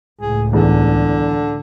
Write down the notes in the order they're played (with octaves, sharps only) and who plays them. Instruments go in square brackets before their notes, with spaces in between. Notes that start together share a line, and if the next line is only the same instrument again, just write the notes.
[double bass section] C#2 A2 [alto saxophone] G#4
[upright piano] E2 E3 [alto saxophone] D3